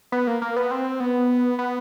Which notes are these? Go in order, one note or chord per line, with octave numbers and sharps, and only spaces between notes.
B3
A#3
A#3
B3
C4
B3
B3